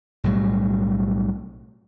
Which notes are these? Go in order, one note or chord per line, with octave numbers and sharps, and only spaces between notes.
B1 A2 F#3 G3